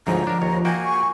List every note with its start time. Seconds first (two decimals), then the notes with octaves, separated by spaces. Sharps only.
0.07 D2 G#2 F3 C#5 A#5
0.27 D4 A#4
0.42 D#2 C#5 D#5
0.65 A#3 F#4 D#5 G5 G#5
0.84 C#6